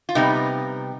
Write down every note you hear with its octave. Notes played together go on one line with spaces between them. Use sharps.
F4
C3 G3 B3 D#4